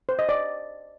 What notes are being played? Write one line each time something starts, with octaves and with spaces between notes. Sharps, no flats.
C5
D#5
D5